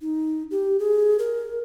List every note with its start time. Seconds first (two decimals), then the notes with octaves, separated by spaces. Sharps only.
0.01 D#4
0.51 G4
0.79 G#4
1.19 A#4